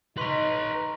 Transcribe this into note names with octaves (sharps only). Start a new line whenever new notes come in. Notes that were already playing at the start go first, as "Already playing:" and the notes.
D#4 B4 A#5 C6 C#6 B6